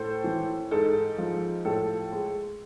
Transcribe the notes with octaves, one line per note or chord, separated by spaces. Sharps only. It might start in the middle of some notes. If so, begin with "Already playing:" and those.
Already playing: A2 A4 C5
E3
G#2 A4
F3
A2 A4
G#3